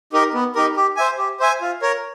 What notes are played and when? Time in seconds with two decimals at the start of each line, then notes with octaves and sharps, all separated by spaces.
0.13 D#4 G4 A#4
0.34 B3
0.55 D#4 G4 A#4
0.77 G4
0.97 C5 E5 G#5
1.18 G4
1.40 C5 E5 G#5
1.61 F4
1.82 A#4 C#5